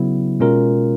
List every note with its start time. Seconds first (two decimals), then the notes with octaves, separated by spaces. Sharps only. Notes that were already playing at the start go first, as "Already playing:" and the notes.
Already playing: C#3 F#3 B3 E4
0.40 B2 G#3 C#4 F4 A#4